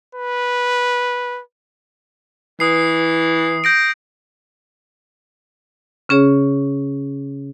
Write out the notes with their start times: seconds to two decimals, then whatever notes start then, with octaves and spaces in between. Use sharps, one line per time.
0.15 B4
2.60 E3 D#6 C7
3.64 G6 A#6 D7
6.09 C#3 C#4 G#4 C#5